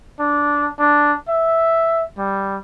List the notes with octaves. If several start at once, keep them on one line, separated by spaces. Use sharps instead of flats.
D4
D4
E5
G3